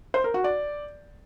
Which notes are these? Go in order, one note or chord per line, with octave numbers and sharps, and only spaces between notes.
C5
A#4
F#4
D5